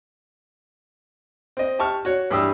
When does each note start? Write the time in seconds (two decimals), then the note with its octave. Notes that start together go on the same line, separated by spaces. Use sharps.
1.57 C4 D#5
1.79 G4 A5 C#6 F6
2.05 F#4 C#5
2.31 G2 E3 G3 G4 D#6 E6